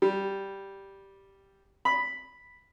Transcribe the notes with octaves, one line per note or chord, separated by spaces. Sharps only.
G3
B5